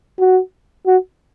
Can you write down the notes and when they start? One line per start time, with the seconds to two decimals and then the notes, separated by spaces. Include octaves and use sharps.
0.19 F#4
0.87 F#4